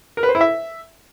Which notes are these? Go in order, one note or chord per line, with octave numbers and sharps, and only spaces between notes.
A#4
B4
C5
E4
E5